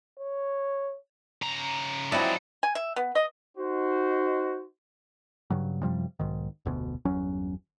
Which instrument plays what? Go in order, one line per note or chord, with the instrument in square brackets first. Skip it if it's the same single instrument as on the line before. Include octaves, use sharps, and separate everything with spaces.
[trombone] C#5
[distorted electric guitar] C#3 A#5
[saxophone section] F3 F#3 D5 [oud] C4 E4 [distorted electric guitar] C#4 D#4
[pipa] G#5
E5
B3
D#5
[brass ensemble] D#4 F#4 C5
[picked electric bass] G2 C#3 F#3
F#2 C3 F3 G3
B1 G#2 D#3
F1 D2 B2
G1 E2 F#3 C#4